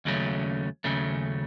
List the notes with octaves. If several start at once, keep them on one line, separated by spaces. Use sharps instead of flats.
D#2 C#3 F#3 A3 C#4
D#2 C#3 F#3 A3 C#4